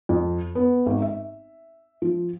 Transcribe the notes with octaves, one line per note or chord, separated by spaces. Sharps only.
F2
B3
G#1
E5
F3